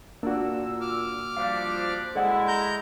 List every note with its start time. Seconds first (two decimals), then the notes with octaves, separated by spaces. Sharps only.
0.23 A#2 A#3 D4 F#4 E6
0.81 D6 F6
1.37 F3 G3 D4 F5
2.15 G#3 E4 A4 D5 F#5
2.48 A#5 G6